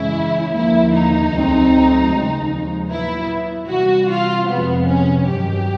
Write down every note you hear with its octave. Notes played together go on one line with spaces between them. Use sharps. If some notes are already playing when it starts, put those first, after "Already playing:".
Already playing: F#2 C#3 E3 G#3 C#4 E4
D#2 D3 F3 A#3 E4
D#4
C#2 C#3 F#3 A3 C4
D#2 C#3 F3 G#3
A#2 F#3 B3 E4
C3 E3 G3 F#4
F4
F2 C3 F3 G#3 B3 C4
C#4
G2 D#3 F#3 G4